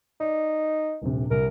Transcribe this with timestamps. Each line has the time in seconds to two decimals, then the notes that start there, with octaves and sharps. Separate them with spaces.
0.20 D#4 D5
1.02 D#1 A#1 C3
1.31 C2 A#4